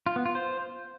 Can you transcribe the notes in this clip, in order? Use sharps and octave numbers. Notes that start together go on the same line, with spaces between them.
F4
B3
F4
C5